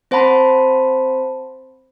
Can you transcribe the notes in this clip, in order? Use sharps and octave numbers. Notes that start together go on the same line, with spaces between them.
C4 C5 F#5 A5 B5 C6